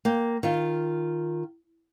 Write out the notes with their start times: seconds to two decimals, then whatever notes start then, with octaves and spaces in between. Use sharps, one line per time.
0.05 A#3 G5
0.43 D#3 F4